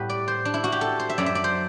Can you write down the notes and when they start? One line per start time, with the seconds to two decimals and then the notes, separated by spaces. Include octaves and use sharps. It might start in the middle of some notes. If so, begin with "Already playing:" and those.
Already playing: A2 G3 B3 G4 B4
0.10 D5
0.28 C5
0.45 D4
0.54 E4
0.64 F#4
0.72 G4
0.81 A4
1.00 C5
1.10 E5
1.18 F#2 F#3 B3 D5
1.26 E5
1.35 D5
1.44 C5